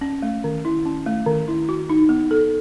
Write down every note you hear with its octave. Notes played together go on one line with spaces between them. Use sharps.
C#4
A3
D#3
E4
C#4
A3
D#3
E4
F#4
D#4
B3
A4